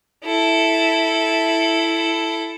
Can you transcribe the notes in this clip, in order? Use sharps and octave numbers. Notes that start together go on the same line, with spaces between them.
E4 A4